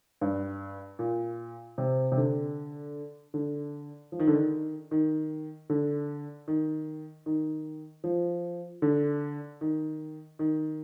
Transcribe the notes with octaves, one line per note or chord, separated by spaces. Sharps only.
G2
A#2
C3
C3
D3
D3
F3
D#3
D3
D#3
D#3
D3
D#3
D#3
F3
D3
D#3
D#3